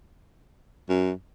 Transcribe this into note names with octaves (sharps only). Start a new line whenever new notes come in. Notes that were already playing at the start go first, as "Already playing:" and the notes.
F#2